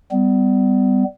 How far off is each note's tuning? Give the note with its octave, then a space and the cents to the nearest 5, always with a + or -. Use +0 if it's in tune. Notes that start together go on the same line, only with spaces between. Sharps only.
G3 +0 B3 +35